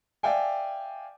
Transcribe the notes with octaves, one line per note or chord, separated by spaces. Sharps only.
D5 E5 F5 G5 G#5